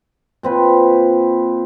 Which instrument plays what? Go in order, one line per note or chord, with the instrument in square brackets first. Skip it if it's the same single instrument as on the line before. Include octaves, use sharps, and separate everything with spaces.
[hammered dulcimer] A#2 C4 B4